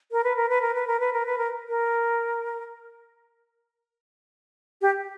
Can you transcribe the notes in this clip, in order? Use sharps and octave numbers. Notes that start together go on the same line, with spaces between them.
A#4
B4
A#4
B4
A#4
B4
A#4
B4
A#4
B4
A#4
A#4
G4